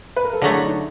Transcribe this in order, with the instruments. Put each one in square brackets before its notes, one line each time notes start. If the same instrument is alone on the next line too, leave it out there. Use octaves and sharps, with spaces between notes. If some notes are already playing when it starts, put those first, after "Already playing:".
[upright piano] B4
A#4
A4
[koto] D3 F#3 A3 [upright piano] G#4
[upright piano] E4
D#4